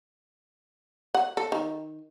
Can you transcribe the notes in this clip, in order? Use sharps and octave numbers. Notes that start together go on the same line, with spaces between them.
F#5
A4
D#3